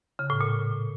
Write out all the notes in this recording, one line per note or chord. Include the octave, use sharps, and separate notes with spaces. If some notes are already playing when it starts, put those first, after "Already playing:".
C#3
A2
A#2